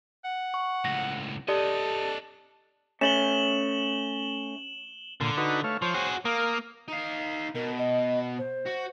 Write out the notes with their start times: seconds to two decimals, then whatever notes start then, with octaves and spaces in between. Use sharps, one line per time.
0.24 F#5
0.54 C#6
0.85 C#2 A2 A#6
1.48 D4 G4 A4 D5 D#5 D#6
3.01 A3 C#4 E7 F#7 G7
5.21 A#2 D3 C6
5.37 D#4 F#4 B4
5.64 A3 C#5 F5
5.82 F3 C5 C#5
5.94 F#4 G#4
6.25 A#3 A#4 F5 D#6
6.88 D#4 F5
7.55 B2 A#4
7.78 D#5
8.38 C5
8.66 F#4